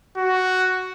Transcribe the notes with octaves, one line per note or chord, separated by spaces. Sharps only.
F#4